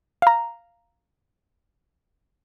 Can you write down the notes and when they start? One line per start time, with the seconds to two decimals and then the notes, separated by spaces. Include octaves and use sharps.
0.22 F5 A#5